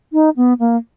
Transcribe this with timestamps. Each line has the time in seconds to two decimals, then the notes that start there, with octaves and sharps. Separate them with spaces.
0.13 D#4
0.37 B3
0.60 A#3